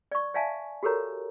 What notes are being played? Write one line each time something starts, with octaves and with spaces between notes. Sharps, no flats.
D5 C#6
D5 E5 F5 G#5 A5
F#4 G4 A4 A#4 C#5 A#5